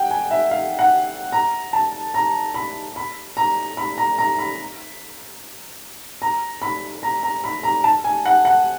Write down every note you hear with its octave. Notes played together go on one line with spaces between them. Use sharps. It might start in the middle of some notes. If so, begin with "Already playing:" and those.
Already playing: F#5 G5
G#5
E5
F5
F#5
A#5
A5
A#5
B5
B5
A#5
B5
A#5
A#5
B5
A#5
B5
A#5
A#5
B5
A#5
A5
G#5
F#5
F#5